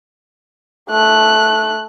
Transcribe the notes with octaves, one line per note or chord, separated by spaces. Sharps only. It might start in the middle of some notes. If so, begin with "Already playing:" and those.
A3 F#6